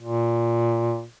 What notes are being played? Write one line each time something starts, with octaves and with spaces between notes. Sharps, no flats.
A#2